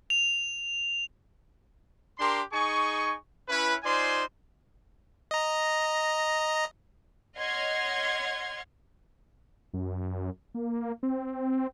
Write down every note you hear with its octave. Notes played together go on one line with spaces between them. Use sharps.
F7
D4 G4 A#4 C6
D#4 G#4 G#5 C#6
C#4 E4 B4
D#4 F4 C5 D5 G#5 C6
D#5 A#5
C#5 D#5 F#5 C6 F6 G#6
F#2
A#3
C4